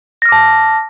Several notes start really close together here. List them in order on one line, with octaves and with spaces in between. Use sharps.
A#6 F6 D6 A5